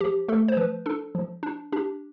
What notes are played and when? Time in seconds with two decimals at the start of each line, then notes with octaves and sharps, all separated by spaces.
0.01 F3 G4
0.28 A3 A4
0.48 C5
0.57 F3 B4
0.86 D4 A4
1.15 F3
1.43 D4
1.72 D4 G4